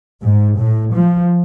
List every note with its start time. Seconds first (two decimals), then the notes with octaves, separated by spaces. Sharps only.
0.21 G#2
0.57 A2
0.93 F3